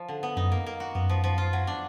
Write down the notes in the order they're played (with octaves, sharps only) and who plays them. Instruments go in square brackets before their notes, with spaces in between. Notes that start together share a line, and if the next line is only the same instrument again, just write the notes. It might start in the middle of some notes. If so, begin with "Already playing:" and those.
Already playing: [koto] F3
D3
B3
[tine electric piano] F#2 [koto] D#4
[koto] A#3
A#3
F#4
[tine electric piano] F#2 [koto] B3
[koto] F3
F3
F4
F#3
D4